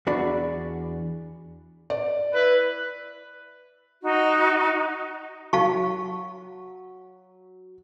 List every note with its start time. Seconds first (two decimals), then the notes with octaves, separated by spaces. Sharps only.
0.07 E2 D4 F#4 D5 B5
1.90 D5
2.33 E4 B4
4.02 D#4 F#4
5.53 F#3 F5 A5 C#6